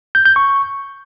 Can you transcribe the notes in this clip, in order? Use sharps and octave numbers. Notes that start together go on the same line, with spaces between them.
G6
G6
C#6